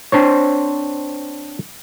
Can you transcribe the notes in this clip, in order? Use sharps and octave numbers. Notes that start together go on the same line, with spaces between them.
C4 D4 C5 C#5